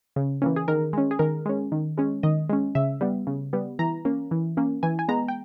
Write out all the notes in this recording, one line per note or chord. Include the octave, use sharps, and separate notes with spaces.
C#3
E3 A#3 C#4
G#4
D#3 A#4
G#3 C#4
G#4
D#3 A#4
G#3 C#4
D#3
G#3 C#4
D#3 D#5
G#3 C#4
C#3 E5
G3 B3
C#3
G3 B3
E3 A#5
A#3 C#4
E3
A#3 C#4
E3 G#5
G#5
G#3 B3 A#5
G5